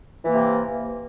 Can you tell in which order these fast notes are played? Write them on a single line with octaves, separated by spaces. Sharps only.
E3 A#3 C3